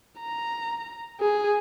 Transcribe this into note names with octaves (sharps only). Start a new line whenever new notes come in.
A#5
G#4